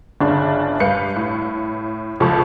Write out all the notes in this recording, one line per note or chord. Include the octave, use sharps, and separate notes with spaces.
G1 C#3 D4
G2 B4 F5 G6 C#7
A2
C#2 F3 A4 A5 C#6